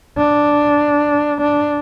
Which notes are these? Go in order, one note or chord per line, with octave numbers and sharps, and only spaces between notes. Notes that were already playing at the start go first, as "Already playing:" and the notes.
D4
D4